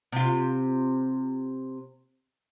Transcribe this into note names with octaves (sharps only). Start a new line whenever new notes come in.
C3 F4